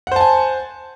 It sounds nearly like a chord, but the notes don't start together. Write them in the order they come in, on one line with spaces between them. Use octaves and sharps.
F#5 C5 A5 G#5